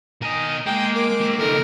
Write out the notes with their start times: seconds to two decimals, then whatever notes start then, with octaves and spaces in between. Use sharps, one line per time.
0.22 B2 A#4 D#5 G#5
0.66 G#3 A#3 G#4 G5
0.95 A#4 D6
1.21 A#3 C5
1.39 F2 C#3 F3 D#4 A4 A#4